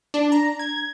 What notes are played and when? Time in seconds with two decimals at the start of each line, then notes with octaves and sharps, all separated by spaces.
0.14 D4
0.32 A#5
0.59 G#6